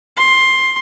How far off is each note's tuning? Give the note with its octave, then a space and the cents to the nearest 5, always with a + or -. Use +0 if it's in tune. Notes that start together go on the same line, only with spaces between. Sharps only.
C6 +15